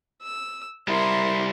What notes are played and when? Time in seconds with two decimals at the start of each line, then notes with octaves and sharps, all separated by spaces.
0.22 E6
0.88 G3 E4 A#4 C6